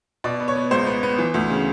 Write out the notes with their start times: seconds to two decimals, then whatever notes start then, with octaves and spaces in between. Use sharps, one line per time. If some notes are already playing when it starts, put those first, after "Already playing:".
0.24 B2 D5
0.40 B3
0.48 C#5
0.56 B3
0.71 C#2 C5
0.87 B3
1.03 B3
1.18 E3
1.34 D2
1.50 C#3